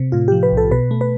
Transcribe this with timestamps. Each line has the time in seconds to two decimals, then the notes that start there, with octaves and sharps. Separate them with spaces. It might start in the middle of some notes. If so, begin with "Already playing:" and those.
Already playing: C3
0.12 A2 F4
0.28 F3 G4
0.43 B4
0.52 B1
0.57 A4
0.71 B2 B4
0.91 A3
1.01 B4